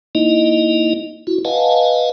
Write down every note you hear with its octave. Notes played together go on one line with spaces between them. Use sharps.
A#3 D#4 E4 D#5
E4 F#4
B4 D#5 F5 F#5 G#5 A5